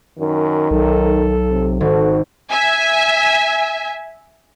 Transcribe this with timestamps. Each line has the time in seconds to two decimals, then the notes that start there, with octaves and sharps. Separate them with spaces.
0.19 F#2 D#3
0.71 B1 A4
1.50 C3
1.81 G#1 F#4 A4
2.51 E5 G#5